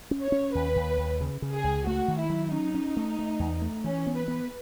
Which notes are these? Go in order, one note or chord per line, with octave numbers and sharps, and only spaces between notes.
C#4
C#5
C#4
D#2 B4
D#2
D#2
C#3
C#3
G#4
C#2
A3 F#4
D#3
E4
F#3
C#4 D#4
C#4
A3
A3
E2
A3
E3 C#4
B3
B4
B3